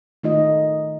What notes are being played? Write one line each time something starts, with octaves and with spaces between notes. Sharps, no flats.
D#3 A3 D#4 F4 D#5